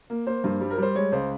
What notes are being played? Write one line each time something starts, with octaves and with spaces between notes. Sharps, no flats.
A#3
A#3 C5
G2
G3
A#4
G3 C5
G#3 C#5
C#2 C5